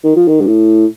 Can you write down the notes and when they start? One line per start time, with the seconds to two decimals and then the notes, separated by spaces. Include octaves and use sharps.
0.04 D#3
0.16 F3
0.28 D#3
0.41 G2
0.47 A2